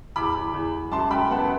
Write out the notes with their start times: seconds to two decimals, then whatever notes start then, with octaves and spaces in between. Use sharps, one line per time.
0.16 E2 B5 D6
0.36 E2
0.54 E2
0.73 E2
0.92 F#2 A5 C6
1.11 F#2 G5 B5
1.30 B3 F#5 A5